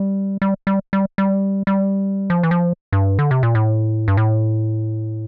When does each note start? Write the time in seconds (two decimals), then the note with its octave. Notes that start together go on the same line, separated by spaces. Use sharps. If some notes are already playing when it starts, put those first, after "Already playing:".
Already playing: G3
0.42 G3
0.67 G3
0.93 G3
1.18 G3
1.67 G3
2.30 F3
2.43 E3
2.51 F3
2.93 G2
3.19 D3
3.31 C3
3.43 A#2
3.55 A2
4.08 G2
4.17 A2